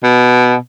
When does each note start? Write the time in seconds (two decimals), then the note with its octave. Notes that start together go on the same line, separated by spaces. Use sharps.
0.03 B2